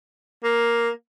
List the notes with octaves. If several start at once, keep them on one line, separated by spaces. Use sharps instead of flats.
A#3